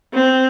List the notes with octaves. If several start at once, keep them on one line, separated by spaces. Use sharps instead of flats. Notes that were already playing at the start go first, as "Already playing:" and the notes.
C4